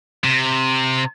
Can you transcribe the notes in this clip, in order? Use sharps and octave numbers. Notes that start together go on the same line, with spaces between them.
C3